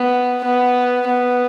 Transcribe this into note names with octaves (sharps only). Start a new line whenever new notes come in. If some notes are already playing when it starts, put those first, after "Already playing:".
Already playing: B3
B3
B3